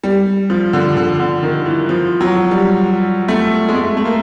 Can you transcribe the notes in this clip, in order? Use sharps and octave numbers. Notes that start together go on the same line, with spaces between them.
G3
F3
D3
D3
D3
D#3
E3
F3
F#3
G3
A3
G#3
A3
A3
A#3